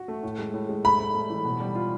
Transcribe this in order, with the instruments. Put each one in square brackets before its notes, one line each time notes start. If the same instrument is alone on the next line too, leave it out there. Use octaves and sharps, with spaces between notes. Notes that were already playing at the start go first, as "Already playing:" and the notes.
Already playing: [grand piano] F#4
A3
A2
G#3
A2
G#3
[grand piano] A3 [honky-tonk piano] B5
[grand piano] A3
A3
E3
B2
G3
F4